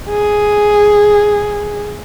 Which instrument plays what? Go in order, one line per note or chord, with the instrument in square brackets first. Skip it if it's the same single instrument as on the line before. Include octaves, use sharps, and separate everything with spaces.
[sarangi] G#4